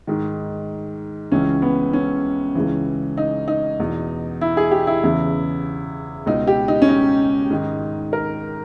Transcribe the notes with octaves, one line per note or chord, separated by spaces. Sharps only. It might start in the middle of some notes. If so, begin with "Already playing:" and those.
G#2 D#3
C#2 C#3 E3 C#4
B3
C#4
C#2 C#3 E3
D#4
D#4
E2 B2
E4
G#4
G4
E4
E2 C#3 E3
C#2 B2 D#4
G4
D#4
C#4
D#4
G#2 D#3
A#4